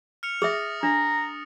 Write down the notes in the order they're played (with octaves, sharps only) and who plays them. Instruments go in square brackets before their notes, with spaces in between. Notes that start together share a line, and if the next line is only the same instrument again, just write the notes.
[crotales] F6 C#7 F7
[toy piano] G#4 E5 [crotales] D#6 A6 A#6
[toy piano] D4 [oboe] A#5